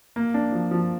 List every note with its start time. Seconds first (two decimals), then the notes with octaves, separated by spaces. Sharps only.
0.16 A#3
0.34 D4
0.52 F3
0.71 F3